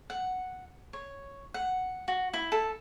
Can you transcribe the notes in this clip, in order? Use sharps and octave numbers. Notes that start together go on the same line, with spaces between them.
F#5
C#5
F#5
F#4
E4
A4